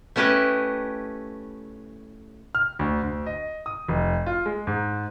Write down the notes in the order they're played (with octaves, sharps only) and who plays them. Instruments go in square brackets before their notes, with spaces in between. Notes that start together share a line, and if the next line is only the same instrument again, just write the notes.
[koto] A3 C#4 E4 G4 B4 D#5
[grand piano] F6
D2
D2
D#5
D#6
F1
F4
G#3
G#2